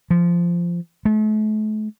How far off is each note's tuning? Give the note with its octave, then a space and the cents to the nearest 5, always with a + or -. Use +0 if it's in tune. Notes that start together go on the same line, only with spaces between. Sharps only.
F3 -15
A3 -40